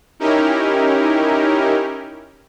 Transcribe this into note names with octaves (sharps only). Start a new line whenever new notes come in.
C#4 D#4 E4 G4 A#4